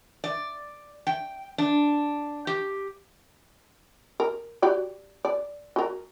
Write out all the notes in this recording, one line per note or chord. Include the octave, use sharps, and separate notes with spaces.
D5
G5
D4
G4
A#4
F#4 G4 D5
D5
F#4 A#4